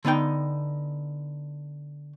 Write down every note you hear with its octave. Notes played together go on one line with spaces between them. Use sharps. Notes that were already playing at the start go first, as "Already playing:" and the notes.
D3 B3 D#4 G5